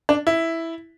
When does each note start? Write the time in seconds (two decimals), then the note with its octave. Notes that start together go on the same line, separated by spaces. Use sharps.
0.09 D4
0.27 E4